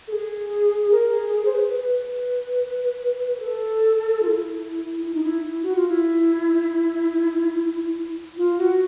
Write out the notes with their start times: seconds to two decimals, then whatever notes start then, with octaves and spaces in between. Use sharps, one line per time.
0.08 A4
0.12 G#4
0.91 A#4
1.11 G#4
1.33 G#4
1.45 C5
1.52 B4
1.73 B4
3.40 A4
4.23 F4
4.27 E4
5.06 E4
5.15 D#4
5.23 E4
5.63 F#4
5.75 F4
5.89 E4
8.37 F4
8.58 F#4